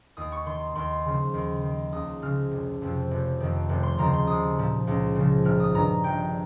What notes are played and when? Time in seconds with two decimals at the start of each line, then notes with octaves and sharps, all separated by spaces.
0.17 D#2 D#6
0.32 C#6
0.46 D#3 C6
0.75 D#2 C6
1.05 C#3 F3
1.34 D#2
1.63 D#3
1.92 C#2 D#6
2.22 C#3 F3 F6
2.51 F1
2.81 F2 C3 F3
3.11 F1
3.40 F2 D#3
3.69 F1
3.83 C6
3.98 D#2 C#3 F3 A#5
4.14 C6
4.27 C2 D#6
4.57 A#2 F3
4.87 C#2
5.16 C#3 F3
5.45 G#1 F6
5.60 D#6
5.74 G2 D#3 A#5
6.04 A#1 G5